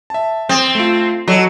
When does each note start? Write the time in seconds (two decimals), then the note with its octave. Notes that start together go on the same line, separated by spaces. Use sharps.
0.10 E5 A5
0.49 C4 D#6 A6 E7
0.75 A3 F4
1.28 F#3 A4 D#5 A#5